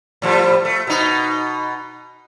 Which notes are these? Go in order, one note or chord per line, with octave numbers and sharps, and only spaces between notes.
A2 F3 G3
A3
B2 D#4